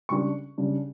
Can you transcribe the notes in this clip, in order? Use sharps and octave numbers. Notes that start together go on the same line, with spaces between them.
C#3 G3 D4 C#6
C#3 G3 D4